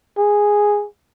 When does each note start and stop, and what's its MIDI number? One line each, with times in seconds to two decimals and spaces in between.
0.18 0.86 68